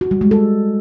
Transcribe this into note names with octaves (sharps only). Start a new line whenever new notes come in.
F#4
G3
G#3
A4